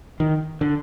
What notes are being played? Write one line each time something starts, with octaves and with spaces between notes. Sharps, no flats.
D#3
D3